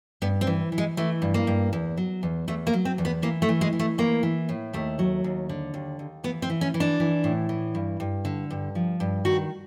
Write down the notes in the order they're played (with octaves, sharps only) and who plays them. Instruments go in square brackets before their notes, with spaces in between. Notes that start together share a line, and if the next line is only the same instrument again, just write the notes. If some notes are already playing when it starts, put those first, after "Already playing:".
[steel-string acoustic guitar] G2 B3
C4
E3
E3
G#3
E3 A3
G2
A#3
G2
E2
F#3
E2
E2 A3
A#3
F#3
C4
E2
B3
E3 A#3
A3
E3
G#3
E3
A3
E3 A#3
E3
A2
D#2 A3
F#3
D#2
D3
D#2
D#2
E3 B3
C4
E3
C#4
E3
D4
E3
A2
E3
G2
G2
D3
G2
F3
G2
D#3 F#4